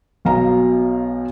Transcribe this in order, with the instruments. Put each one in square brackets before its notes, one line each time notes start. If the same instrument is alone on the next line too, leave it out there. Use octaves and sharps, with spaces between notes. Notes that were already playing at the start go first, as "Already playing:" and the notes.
[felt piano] B1 B2 F5 A#5